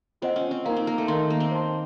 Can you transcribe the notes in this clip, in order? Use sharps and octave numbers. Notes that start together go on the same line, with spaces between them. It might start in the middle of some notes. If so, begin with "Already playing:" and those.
C4 F4 C5 D#5 F#5
C#4
C4
A#3 D#4 A#4 F5
C4
A#3
A3
D#3 A#4 F5 C6
A#3
C4
C5 F5 A5 C6